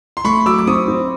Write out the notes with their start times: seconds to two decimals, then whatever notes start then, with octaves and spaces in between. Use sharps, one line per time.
0.17 C6
0.24 A3 B5 C#6
0.46 F#3 D6 E6
0.58 D6
0.67 C4 C#6 D#6
0.88 C4